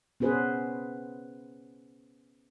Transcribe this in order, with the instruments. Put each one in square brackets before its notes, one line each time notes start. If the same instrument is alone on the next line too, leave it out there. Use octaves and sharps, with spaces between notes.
[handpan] B3 C#4 G#4 B4 C5